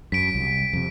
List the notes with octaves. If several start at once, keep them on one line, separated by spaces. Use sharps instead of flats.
F#2 B6 D7
C2
F2 C3